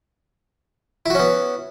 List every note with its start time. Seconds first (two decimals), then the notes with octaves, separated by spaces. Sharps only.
1.06 E4
1.10 F#4
1.15 C#4
1.19 B3